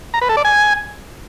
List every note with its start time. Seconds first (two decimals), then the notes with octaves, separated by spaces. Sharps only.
0.14 A#5
0.21 B4
0.29 A4
0.37 D5
0.45 G#5